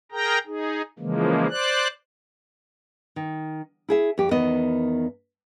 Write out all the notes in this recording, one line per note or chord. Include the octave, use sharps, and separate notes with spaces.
G#4 A#4 G5 A#5
D#4 G#4
C#3 E3 F3 G#3 A#3
C5 D5 F#6
D#3
E4 G#4 E5
F2 G4
E2 D#3 B3 D#5